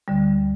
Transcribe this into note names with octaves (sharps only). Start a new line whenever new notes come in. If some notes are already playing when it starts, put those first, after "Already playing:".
D2 D3 G3